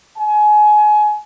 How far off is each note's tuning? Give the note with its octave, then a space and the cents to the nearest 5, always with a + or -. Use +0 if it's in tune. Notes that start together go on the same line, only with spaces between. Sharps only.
G#5 +25